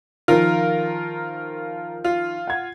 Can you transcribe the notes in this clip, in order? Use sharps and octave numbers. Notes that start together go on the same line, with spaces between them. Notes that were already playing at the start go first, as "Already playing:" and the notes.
D#3 F3 F4 A#4
F4
F#5 G#6